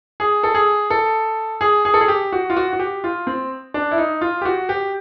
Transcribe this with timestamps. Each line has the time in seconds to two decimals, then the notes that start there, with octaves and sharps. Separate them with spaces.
0.20 G#4
0.43 A4
0.55 G#4
0.90 A4
1.61 G#4
1.85 G#4
1.94 A4
2.01 G#4
2.08 G4
2.32 F#4
2.50 F4
2.57 F#4
2.73 F#4
2.79 G4
3.04 F4
3.27 C4
3.74 D4
3.91 E4
3.98 D#4
4.21 F4
4.41 G4
4.45 F#4
4.69 G4